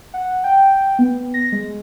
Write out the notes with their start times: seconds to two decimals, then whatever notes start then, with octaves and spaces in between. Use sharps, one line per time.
0.14 F#5
0.44 G5
0.99 B3
1.34 A#6
1.52 G#3